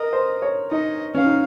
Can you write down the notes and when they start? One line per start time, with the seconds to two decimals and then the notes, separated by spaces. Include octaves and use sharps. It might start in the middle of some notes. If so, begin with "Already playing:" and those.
Already playing: A#4 D#5
0.13 C5
0.42 C#5
0.71 D#4 D#5
1.15 C#4 F5
1.26 D#4